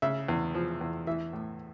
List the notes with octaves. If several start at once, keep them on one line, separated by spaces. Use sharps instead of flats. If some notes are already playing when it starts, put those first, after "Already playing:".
C#3 E5
E2
F3
E2
E3 E5
A2